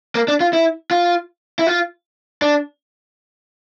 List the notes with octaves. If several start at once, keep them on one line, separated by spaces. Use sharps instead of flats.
A#3
D4
F4
E4
F4
E4
F4
D4